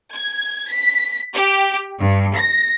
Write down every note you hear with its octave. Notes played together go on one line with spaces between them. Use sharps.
G#6
B6
G4
G2
A#6